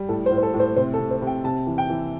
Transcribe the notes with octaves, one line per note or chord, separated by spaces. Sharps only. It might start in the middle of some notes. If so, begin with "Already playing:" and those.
Already playing: G3
A2 A4
C5
A2
C5
A4
A2
C5
C3 C5
A4
C3
C5
C3
G5
C3 A5
E3
G5
E3